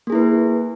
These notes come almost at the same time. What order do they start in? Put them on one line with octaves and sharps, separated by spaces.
A#3 G#4 E4 B4